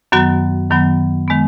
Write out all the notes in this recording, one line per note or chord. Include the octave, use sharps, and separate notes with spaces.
F#2 D#3 F#3 B3 F#4
F#2 D#3 F#3 B3
D#3 G#3 B3